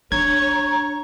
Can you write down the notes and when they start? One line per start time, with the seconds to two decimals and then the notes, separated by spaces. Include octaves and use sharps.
0.12 D4 C#5 A#5 G#6